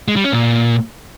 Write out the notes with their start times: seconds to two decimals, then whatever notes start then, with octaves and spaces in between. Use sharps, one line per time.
0.08 G#3
0.16 G3
0.24 C#4
0.32 A#2